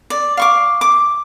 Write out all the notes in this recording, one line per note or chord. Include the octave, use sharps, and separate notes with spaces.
D5
F5 C#6 D6
D6